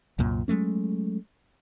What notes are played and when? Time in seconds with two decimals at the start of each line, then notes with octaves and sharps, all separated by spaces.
0.19 C2 F#2 A#2
0.48 F#3 G#3 A3 C#4